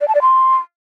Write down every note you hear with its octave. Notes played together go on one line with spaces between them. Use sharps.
D5
A5
D5
C6